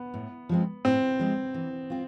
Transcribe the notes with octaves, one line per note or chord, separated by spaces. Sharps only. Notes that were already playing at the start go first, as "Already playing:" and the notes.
Already playing: B3
A2
F3 G#3 C4
A2 C4
F3 G#3 C4
E3
C4 F4